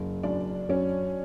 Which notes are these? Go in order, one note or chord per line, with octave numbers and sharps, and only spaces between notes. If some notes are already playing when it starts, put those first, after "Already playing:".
Already playing: F#1
F#2 D4
F#3 C#4